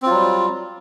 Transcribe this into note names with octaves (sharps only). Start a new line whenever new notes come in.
F#3 G3 C4 F4